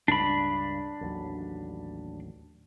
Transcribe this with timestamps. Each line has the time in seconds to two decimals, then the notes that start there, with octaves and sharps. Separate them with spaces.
0.08 C#2 G2 D4 B5
1.01 A1 D#2 F#3